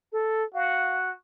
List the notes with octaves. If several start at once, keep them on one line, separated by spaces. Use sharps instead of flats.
A4
F#4 F5